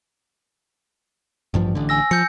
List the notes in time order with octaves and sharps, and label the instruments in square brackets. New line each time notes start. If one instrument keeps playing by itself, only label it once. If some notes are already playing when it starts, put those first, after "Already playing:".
[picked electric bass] A1 G2 F3
A1 D3
[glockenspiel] G#5 E6 A#6
[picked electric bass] F3 [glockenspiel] G6 C#7